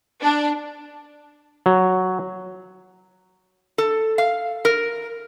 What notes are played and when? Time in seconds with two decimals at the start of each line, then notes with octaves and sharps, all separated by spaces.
0.21 D4
1.66 F#3
3.78 A4
4.18 F5
4.65 A#4